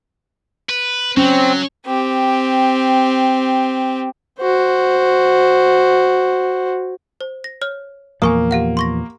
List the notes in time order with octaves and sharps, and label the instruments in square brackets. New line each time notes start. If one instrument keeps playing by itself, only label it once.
[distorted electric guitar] B4
[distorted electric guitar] F#3 [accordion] C4 [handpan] C#4
[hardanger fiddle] C4 G4
[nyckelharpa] F#4 C5
[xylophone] C5
A#6
C#5 F6
[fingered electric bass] E2 A#2 F3 [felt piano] A#3 [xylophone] G#5 C#6 D#6
[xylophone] G4 F5 F#5
C6 C#6 A#6